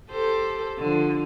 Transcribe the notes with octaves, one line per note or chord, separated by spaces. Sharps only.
G4 A4 C5
D3 F3